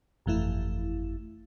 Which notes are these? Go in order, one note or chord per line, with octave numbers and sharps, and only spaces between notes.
G1 F2 E3 A3 E4